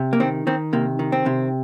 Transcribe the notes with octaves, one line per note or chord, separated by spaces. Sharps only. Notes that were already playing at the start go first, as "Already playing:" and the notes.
Already playing: C3
A#3
D#3 C4
D#3 C4
C3 A#3
D#3
C4
C3